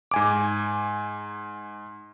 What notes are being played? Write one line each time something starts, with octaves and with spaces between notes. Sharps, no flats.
G#2 G#5 D6